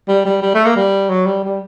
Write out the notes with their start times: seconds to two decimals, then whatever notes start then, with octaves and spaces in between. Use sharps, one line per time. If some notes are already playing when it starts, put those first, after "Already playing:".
0.08 G3
0.25 G3
0.42 G3
0.54 A3
0.65 A#3
0.76 G3
1.09 F#3
1.26 G3
1.43 G3